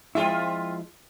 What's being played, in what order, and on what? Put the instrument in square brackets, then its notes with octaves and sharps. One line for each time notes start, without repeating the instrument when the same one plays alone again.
[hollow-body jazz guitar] F3 G#3 E4 [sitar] C4 F4 E5